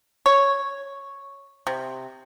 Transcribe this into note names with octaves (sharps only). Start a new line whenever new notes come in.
C#5
C3